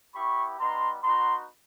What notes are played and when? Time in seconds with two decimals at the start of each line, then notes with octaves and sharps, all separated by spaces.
0.15 B3 E4 G4 B5 C#6
0.59 G3 B3 D#4 A#5 C6
1.03 B3 D#4 F#4 A#5 C6